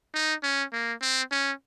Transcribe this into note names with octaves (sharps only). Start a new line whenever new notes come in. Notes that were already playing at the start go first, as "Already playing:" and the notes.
D#4
C#4
A#3
C4
C#4